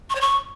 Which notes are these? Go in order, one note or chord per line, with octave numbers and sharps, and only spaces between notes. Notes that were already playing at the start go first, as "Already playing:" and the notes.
C#6
C#5
C#6